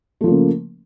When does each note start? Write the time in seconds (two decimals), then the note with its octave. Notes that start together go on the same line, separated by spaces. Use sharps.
0.21 A3
0.24 F3
0.27 A#3
0.31 C#3